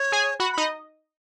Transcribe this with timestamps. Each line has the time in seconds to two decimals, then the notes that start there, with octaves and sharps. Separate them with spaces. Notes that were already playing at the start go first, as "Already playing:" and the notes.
Already playing: C#5
0.12 G#4 G#5
0.40 F#4 F#5 B5
0.52 B5
0.58 D#4 D#5